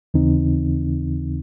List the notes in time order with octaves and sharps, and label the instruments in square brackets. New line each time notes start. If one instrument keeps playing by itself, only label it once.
[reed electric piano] D#2 C#3 E3 C4 D#4